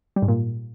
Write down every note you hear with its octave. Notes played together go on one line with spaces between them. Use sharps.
G3
G#2
A#2